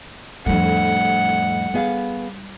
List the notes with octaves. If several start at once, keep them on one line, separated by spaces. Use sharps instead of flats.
F2 A2 G3 D4 F#5
B3 G#4 F5